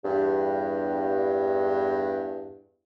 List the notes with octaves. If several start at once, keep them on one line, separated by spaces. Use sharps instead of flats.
E2 G2